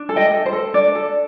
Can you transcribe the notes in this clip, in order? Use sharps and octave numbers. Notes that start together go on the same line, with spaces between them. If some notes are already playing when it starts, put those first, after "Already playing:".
Already playing: D4
A4
D#5 G5
A4
C5
A4
D4 D5
A4